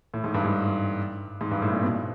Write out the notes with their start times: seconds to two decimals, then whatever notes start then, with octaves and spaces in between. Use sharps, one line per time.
0.14 A2
0.24 G#2
0.34 G2
0.45 G#2
1.41 G#2
1.51 G2
1.62 A2
1.72 A#2
1.83 B2